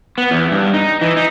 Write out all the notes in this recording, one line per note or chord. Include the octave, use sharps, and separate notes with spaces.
B3
E2
G2
D#4
E3
D#4